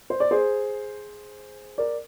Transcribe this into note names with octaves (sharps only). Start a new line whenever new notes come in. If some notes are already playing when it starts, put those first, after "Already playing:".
C5
D5
G#4 C5
A#4 D5